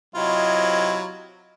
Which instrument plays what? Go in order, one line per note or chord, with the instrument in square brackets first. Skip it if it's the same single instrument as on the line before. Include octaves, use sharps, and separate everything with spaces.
[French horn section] C3 D#5 [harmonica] F#3 E4 F4